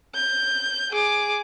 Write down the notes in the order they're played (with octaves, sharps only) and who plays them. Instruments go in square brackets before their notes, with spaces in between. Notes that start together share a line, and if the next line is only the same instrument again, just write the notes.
[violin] G6
G#4 D6